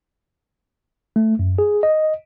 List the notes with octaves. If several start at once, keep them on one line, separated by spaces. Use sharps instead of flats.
A3
F#2
G#4
D#5